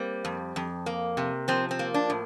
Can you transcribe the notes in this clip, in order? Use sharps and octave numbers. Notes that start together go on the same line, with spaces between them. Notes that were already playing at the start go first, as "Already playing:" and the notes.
Already playing: G3 A#3 C4
F2
F2
A#3
C3
F3 C4
C4
A#3
D4
A2